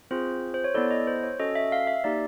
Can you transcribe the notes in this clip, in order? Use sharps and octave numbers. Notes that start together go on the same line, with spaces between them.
C4 F4 G#4 C5
C5
C#5
B3 E4 A4 D5
D#5
C5
C#5
C#4 F#4 A4 D#5
E5
F5
E5
A#3 D#4 G4 D5